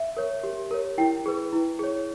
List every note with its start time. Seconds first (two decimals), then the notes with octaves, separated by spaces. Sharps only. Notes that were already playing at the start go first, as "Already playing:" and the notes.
Already playing: E5
0.17 A#4 C#5
0.43 G4
0.71 A#4 C#5
0.98 E4 G5
1.26 G#4 B4
1.53 E4
1.79 G#4 C#5